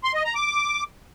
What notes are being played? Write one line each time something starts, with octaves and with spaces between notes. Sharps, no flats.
C6
D#5
A#5
D6